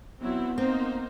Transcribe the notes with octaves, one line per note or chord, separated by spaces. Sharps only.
F#3 B3 C4 E4
A#3 C4 D#4 C5